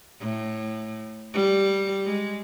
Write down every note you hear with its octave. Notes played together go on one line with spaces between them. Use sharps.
A2
G3
G#3